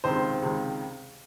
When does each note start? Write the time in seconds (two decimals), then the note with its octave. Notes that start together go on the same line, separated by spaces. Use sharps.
0.04 C#2 C3 D#3 C5
0.42 C#2 C3 D#3